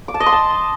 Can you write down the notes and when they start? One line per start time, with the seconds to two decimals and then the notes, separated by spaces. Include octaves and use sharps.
0.08 D6
0.14 A5
0.20 D#5
0.26 C6
0.32 A5